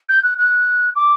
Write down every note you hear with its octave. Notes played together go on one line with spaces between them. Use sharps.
G6
F#6
F#6
D6